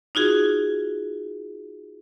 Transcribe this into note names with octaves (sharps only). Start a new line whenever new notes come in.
D#4 F4 F#4 G#4